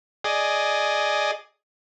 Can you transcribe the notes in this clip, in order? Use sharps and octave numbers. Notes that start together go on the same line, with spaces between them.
G#4 D5 D#5